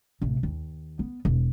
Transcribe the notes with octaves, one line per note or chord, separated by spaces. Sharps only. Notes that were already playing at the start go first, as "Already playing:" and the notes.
A1 C3
D#2
B3
E1